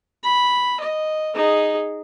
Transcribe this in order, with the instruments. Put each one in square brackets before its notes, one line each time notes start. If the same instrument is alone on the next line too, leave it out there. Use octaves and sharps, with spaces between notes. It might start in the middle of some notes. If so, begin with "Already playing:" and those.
[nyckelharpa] B5
D#5
D#4 G#4